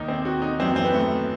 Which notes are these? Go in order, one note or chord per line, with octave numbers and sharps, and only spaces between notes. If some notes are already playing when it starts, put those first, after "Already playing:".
Already playing: D#2 D#3 D#4
C4
F#4
D#4
F#2 E3 C4
C4
B3
A3